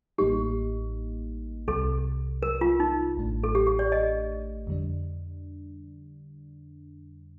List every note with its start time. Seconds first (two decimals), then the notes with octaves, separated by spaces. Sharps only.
0.18 A1 A2 G3 A#3 D#4 G4
1.68 C2 C3 G3 A4
2.43 A#4
2.61 F4
2.80 D#4
3.17 A1 A2 A3 D4
3.43 A4
3.55 G4
3.67 G4
3.79 D5
3.92 D#5
4.67 F2 D3 G3 D4